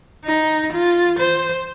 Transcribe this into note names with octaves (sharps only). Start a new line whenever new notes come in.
D#4
F4
C5